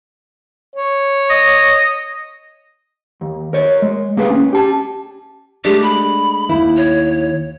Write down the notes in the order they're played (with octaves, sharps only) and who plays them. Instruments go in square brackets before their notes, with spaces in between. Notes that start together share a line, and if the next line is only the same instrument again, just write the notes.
[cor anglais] C#5
[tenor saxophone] D#5
[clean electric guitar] D#2
A#4 C#5
G#3
C2 A#3 G#4 B4
C#4
G4 A5
[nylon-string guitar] G#3 A3 D4 [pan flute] G4
[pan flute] B5
[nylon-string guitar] D#2 E4
[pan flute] C#5